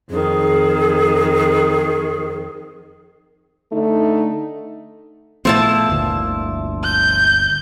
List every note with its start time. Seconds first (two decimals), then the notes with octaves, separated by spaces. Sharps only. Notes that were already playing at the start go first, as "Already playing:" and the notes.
0.11 F2 D#3 G#4
3.72 D3 A3 D#4
5.45 A#2 F3 A3 B3 E4 A5
5.90 G1 D2 A#2
6.83 G6